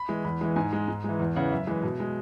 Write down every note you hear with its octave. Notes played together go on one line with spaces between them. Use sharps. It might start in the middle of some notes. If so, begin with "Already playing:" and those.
Already playing: B5
E3 G#3
E2 B5
E3 G#3
G#2 G#5
G#3
G#2
E3 G#3
E2
C#3 E3 F#5
F#2 E5
E3 G#3
B2
G#3